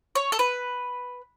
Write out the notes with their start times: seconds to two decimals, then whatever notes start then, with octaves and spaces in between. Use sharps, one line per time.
0.15 C#5
0.32 A4
0.39 B4